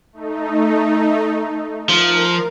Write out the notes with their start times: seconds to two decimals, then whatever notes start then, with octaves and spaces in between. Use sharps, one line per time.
0.13 A3 D#4
1.89 F3 A#4